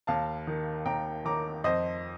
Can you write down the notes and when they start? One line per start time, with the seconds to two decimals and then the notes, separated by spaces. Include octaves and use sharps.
0.07 D#2 F5 A5
0.47 D#3
0.85 D#2 G5 A#5
1.25 D#3 A#5 D6
1.64 F2 C5 D#5